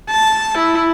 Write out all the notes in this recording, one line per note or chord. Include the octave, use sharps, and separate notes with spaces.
A5
E4